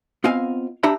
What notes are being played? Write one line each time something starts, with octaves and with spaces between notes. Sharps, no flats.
B3 C4 F4 D#5 F5 G#5
D4 G4 E5 A#5 B5